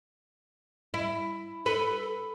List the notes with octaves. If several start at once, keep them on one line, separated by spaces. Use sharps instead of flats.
E4
A4 B4